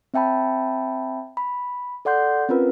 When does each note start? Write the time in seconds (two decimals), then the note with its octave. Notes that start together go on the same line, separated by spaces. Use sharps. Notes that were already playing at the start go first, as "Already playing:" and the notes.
0.14 C4 E5 G5 A5 B5
1.37 B5
2.05 A4 D5 F#5 C6 G6
2.49 C4 C#4 F4 A#4 B4